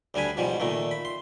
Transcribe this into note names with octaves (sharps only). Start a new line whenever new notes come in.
D2 G3 D4 G#5 B5
G#2 B2 F3 G3
A#2 D#3 A3
B5
C6